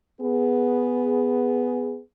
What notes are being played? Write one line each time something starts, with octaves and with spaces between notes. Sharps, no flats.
B3 G#4